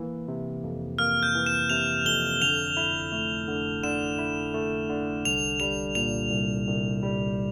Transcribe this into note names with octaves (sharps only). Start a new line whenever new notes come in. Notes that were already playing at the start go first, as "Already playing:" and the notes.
Already playing: E3 A#3
C3
F2
A#3 F6
G6
E3
E7
C3 F7
F2 G7
D3 F7
E4
A3
D3
D3 E7
E4
A3
D3
C2 F7
G3 F7
A#2 F7
C2
C2
G3